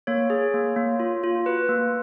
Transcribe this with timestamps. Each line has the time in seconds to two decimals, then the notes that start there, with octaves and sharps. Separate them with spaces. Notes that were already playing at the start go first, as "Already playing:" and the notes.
0.07 A#3 C#5
0.30 G#4
0.54 A#3
0.76 A#3
1.00 F4
1.23 F4
1.46 F#4 B4
1.69 A#3